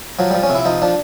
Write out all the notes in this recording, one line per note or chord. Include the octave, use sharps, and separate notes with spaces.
F3 F#3
F3 G3
C#4
C3
E4
F3 D#4
F3 D4